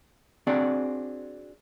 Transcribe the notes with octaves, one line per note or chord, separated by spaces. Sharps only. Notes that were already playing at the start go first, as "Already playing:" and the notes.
C4 D4 F#4 G#4 D5